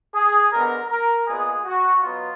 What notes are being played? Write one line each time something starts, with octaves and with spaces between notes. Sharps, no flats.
G#4
D3 G#3 B3 A#4
A#4
A#2 G#3 B3 G#4
F#4
B2 F#3 B3 F4